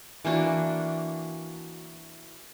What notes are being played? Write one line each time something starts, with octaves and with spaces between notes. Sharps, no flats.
E3 A#3 D4 F#4